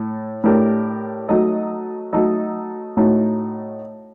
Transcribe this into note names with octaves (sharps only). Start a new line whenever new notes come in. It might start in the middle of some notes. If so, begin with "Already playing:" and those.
Already playing: A2 A3
A2 A3 D4 G4 A#4
F#3 A3 D#4 A4 D#5
F#3 A3 D#4 A4 D#5
A2 A3 D#4 F#4